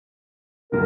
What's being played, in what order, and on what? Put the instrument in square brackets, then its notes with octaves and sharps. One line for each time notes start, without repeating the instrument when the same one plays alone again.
[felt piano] C#2 F#2 D3 [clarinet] A#4